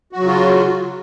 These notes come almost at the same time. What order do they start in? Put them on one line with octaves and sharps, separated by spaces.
F#4 F#3 C#3 F4